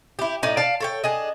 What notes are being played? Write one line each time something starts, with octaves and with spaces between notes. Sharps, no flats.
E4 G4
A2 D#4 D5
D5 F5 A5
A4 C#5 G5
D4 G#4 D#5